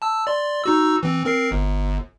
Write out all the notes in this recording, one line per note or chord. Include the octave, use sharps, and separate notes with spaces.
A5 E6
D5 C6
D#4 F#4 E6
E3 C4
C4 A#4 C7
G1